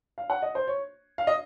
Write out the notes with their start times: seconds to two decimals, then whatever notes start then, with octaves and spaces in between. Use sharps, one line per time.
0.18 F5
0.30 F#5
0.42 D#5
0.55 C5
0.68 C#5
1.18 F5
1.27 D#5